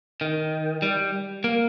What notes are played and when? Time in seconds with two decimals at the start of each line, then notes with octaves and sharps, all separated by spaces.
0.21 D#3
0.82 G3
1.44 A#3